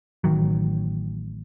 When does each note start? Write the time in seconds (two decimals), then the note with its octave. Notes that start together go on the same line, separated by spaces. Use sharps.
0.24 A1 D#3 F#3